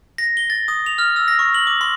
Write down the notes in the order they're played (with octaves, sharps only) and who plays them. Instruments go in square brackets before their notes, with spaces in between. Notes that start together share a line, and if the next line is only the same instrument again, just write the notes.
[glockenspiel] A#6
G7
A6
D#6
F7
F6
E6
A#6
C#6
F#7
D6
C6